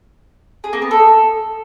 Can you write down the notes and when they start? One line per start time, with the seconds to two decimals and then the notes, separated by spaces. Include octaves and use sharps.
0.64 G#4
0.73 A#3
0.82 B3
0.91 A4